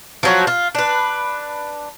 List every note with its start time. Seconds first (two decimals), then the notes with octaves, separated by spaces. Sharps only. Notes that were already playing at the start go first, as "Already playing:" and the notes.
0.23 F3 F#3 F#4
0.47 F4
0.75 D4 B4